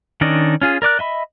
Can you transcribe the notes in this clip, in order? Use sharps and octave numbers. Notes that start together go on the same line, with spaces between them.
D#3 C#4 D4 D5 D#5
C#4 F4 G#4
A#4 D5 D6 F#6
D#5 E5 B5